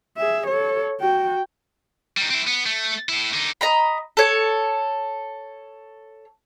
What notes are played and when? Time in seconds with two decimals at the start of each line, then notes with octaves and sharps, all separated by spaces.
0.17 G#4 E5
0.47 A4 C#5
1.00 F#4 G5
2.17 G3 D#4
2.30 C4 E4
2.47 B3
2.66 A3
3.09 A2 E4
3.33 D3 D#4
3.61 D#5 A#5 B5
4.17 A4 C#5